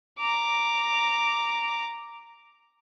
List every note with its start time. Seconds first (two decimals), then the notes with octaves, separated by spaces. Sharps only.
0.19 A#5 D6